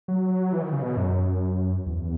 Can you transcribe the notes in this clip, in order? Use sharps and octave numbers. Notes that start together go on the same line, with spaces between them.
F#3
E3
D#3
C#3
B2
F#2
E2